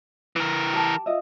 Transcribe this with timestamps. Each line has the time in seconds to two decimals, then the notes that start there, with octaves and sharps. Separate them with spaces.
0.36 E3 A#4
0.73 G4 A5
1.06 F4 D#5 E5